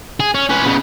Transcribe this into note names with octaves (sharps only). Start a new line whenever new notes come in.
G#4
C#4
C#4 B4
C#3 B3